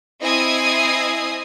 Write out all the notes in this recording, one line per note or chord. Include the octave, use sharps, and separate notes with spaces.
C4 E4 D#5 G#5 D#6 C7